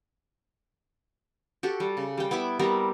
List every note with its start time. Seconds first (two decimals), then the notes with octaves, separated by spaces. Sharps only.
1.63 F#4 G4 A4
1.80 G3
1.97 C#3
2.18 G3 G5
2.31 B3 E4 E5 D6
2.59 G3 B3 C4 A#4